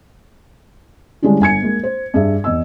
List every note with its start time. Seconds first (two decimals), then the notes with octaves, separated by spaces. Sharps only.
1.22 D3 G3 G#3 C#4 D4 E4
1.40 G1 G#5 G#6 C#7
1.62 G#3 A#3
1.83 C5
2.14 G2 G#4 E5
2.44 E2 D#5 E6